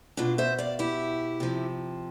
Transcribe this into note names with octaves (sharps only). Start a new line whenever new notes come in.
B2 D4 F4
C5 E5
D5 F5
E4 G4
C3 F3